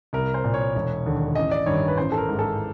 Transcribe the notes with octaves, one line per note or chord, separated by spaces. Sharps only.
C2 A#4
C5
A#2
C#5
E1
D#2 D3
A1 D#5
D5
G2 D#3 C#5
B4
A1 C5
A4
A#4
G#2 E3
A4